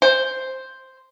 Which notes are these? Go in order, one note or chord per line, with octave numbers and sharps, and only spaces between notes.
C5